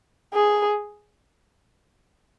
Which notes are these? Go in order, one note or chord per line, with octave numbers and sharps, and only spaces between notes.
G#4